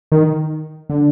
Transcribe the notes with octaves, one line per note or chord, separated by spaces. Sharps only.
D#3
D3